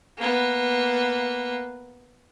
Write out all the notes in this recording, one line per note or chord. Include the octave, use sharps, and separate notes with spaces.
A#3 B3